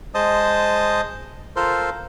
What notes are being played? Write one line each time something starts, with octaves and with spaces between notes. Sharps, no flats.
G#3 C5 D#5 A5 D#6
F4 A4 A#4 C5 C6